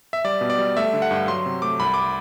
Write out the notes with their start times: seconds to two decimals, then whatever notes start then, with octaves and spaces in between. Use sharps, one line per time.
0.13 E5
0.24 G3 D5
0.41 B2
0.50 D5
0.58 G3
0.77 A3 E5
0.93 D3
1.02 F#5
1.11 G2
1.28 F#3 C6
1.46 C3
1.62 A3 D6
1.80 C2 B5
1.94 D6